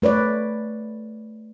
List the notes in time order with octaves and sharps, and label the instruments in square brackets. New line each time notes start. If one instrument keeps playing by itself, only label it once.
[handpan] A3 B4 C#5 D5